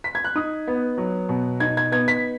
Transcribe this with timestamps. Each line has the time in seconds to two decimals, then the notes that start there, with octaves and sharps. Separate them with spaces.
0.04 B6
0.15 G#6
0.24 F#6
0.36 D#4 D#6
0.67 B3
0.98 F#3
1.29 B2
1.60 D#4 G#6
1.77 G#6
1.92 B3 G#6
2.08 B6